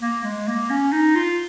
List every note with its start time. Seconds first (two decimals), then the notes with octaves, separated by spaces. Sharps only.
0.02 A#3
0.24 G#3
0.47 A#3
0.70 C#4
0.92 D#4
1.15 F4